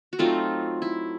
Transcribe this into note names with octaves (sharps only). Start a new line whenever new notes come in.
F#4
F#3 A3 C4 D#4 F4
E4